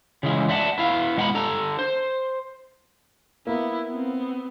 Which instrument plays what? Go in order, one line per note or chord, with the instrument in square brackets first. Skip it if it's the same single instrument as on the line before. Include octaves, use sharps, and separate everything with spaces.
[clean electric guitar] C#3 E3 G#3
D5 E5 F#5 A5
B3 E4 F5
B2 G#3 F#5 G5 A#5 B5
D4 A4 A#5
C5
[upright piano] A#3 [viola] B3 E4
[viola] B3 C4